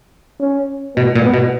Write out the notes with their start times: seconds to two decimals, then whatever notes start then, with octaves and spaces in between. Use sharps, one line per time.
0.40 C#4
0.96 B2 B3
1.15 A#2
1.24 B3
1.34 B2